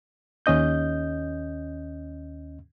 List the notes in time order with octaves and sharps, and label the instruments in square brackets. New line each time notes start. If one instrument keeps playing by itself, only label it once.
[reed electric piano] D#2 C#4 D#5 G6